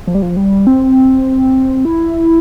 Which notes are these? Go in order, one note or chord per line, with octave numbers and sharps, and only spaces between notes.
F3
G3
F3
G3
C4
E4